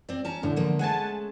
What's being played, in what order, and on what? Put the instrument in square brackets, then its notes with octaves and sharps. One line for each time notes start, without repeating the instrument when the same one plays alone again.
[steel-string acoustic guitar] C4 D5
C#4 A5 A#5
[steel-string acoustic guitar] A2 [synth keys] D3
[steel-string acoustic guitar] F3 A3 A#3
[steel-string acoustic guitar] G#3 A3 C#4 [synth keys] F#5 G#5 A5